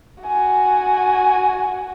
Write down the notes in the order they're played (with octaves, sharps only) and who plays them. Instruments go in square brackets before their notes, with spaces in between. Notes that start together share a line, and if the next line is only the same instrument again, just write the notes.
[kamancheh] F#4 G#5